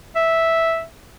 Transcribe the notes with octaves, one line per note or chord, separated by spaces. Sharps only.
E5